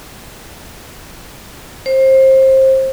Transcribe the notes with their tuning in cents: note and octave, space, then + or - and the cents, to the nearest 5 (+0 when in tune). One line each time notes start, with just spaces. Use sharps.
C5 +25